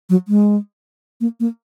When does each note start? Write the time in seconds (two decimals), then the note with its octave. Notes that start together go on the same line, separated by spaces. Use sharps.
0.10 F#3
0.28 G#3
1.21 A#3
1.40 A#3